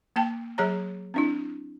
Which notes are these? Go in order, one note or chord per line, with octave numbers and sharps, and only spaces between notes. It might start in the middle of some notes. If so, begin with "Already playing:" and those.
A#3 G5 A5
F#3 G#4 C#5 A#5
C4 D4 E4